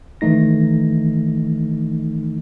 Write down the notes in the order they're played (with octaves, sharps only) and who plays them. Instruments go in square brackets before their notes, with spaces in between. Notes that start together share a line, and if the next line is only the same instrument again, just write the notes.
[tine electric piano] D#3 E3 A3 D#4 A#6